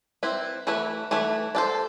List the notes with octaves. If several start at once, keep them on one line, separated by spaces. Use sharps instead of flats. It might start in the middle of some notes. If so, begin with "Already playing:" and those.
C4 E4 B4
E3 A3 E4 B4
E3 A3 E4 B4
D4 A4 C5